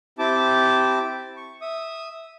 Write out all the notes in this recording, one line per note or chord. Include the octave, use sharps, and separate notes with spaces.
C4 E4 G4 A5 D6
C#6
E5 D#6